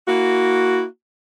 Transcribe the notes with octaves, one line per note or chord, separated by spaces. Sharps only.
A#3 E4 F#4